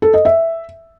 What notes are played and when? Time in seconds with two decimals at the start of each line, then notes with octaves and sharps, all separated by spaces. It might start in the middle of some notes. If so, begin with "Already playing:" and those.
0.02 A4
0.14 D#5
0.25 E5